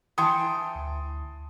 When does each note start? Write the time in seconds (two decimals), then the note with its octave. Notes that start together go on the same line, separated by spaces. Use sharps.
0.18 E3 G5 A5 C6 D#6
0.75 D2